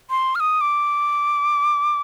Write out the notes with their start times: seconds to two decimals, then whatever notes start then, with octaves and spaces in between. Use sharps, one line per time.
0.10 C6
0.35 F6
0.40 D#6
0.61 D6